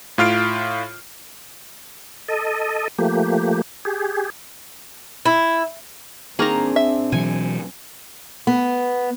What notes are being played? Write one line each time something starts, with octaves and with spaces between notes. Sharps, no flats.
A2 F4 F6 C7 D7
A4 D#5
F3 A3 A#3 G4
G4 G#4
E4
D#3 A#3 C4 D4 G#4 A#5
E5
B2 E3 F#3 G#5
B3